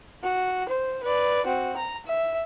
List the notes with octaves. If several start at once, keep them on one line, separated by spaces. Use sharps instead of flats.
F#4
C5
B4 D5
C4 F#4
A#5
E5